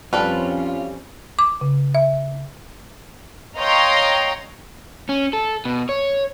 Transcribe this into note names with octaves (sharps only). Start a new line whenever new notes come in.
F2 G3 C4 C#4 F4 A4 B4
D6
C#3
E5
C#5 D#5 F5 G5 A#5 C6
C#4
A4
B2
C#5